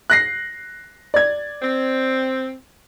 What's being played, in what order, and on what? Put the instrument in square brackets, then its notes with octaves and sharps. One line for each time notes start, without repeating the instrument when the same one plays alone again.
[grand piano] F#6 A#6 C7
D5 G#6
[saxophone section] C4